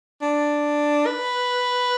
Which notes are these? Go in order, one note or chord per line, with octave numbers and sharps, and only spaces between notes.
D4
B4